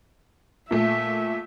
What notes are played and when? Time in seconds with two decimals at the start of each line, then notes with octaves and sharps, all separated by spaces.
0.71 A#2 A3 E5